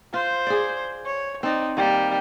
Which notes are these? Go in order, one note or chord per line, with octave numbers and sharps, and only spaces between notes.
F4 C5
G#4 D5
C#5
C4 D#4 D5
D#3 G3 A#3